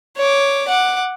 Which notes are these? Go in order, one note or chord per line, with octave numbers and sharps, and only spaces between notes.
C#5 D6
F#5 D6